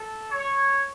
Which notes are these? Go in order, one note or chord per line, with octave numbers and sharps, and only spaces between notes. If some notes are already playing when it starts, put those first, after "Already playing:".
Already playing: A4
C#5